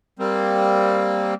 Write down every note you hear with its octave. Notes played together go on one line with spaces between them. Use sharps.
G3 A#3 C4